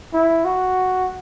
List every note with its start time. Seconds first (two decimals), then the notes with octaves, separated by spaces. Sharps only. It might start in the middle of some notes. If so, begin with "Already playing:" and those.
0.13 E4
0.45 F#4